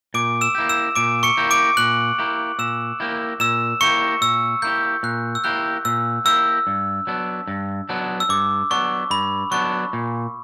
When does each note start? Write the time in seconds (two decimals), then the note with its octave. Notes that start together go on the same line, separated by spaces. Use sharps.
0.14 A#2 D6 D7
0.41 E6 E7
0.55 A#3 E4 G4
0.69 E6 E7
0.95 A#2 D6 D7
1.23 C#6 C#7
1.37 A#3 E4 G4
1.51 D6 D7
1.77 A#2 F#6 F#7
2.18 A#3 E4 G4
2.59 A#2 E6 E7
3.00 A#3 E4 G4
3.40 A#2 E6 E7
3.81 A#3 E4 G4 C#6 C#7
4.21 A#2 E6
4.62 A#3 E4 G4 G6
5.03 A#2 F#6
5.35 E6
5.44 A#3 E4 G4 F#6
5.85 A#2 E6
6.26 A#3 E4 G4 E6
6.67 G2
7.07 F#3 B3 D4
7.47 G2
7.89 F#3 B3 D4
8.20 E6
8.29 G2 D6
8.71 F#3 B3 D4 C#6
9.10 G2 B5
9.51 F#3 B3 D4 C#6
9.93 A#2